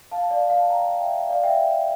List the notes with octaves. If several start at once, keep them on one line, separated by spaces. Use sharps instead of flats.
F5 A5
D5 F5
F5 A5
G5 A#5
E5 G5
D5 F5
E5 G5